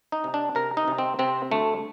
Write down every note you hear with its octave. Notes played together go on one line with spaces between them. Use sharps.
D#4
C3
D4
C3 A#4
D#4
C3
C4
C3 C4
D2 A3